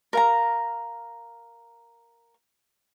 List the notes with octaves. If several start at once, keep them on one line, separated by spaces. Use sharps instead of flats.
A#4 F5 A#5